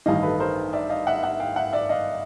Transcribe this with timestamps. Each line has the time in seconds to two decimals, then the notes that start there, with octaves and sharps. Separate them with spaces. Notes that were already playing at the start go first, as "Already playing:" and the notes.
0.06 A1 G2 D#3 D#5 F5
0.23 A4 B4
0.40 A#4 C5
0.73 D5 E5
0.90 D#5 F5
1.07 E5 F#5
1.23 E5 F#5
1.40 F5 G5
1.56 E5 F#5
1.73 D5 E5
1.89 D#5 F5